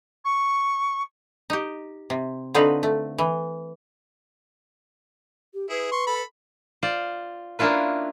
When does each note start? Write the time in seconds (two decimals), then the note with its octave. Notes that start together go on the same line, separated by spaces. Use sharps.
0.25 C#6
1.50 D#4 G4
2.10 C3
2.54 D3 C4 D#4 F4 F#4 B4
2.83 A3
3.18 E3
5.54 G4
5.70 E4 G#4 B4
5.92 C6 C#6
6.07 A4 B5
6.83 F4 C5 D5
7.59 A#3 C#4 D4 E4 F4 B4